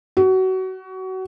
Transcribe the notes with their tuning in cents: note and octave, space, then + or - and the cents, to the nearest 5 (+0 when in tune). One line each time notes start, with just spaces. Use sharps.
F#4 +25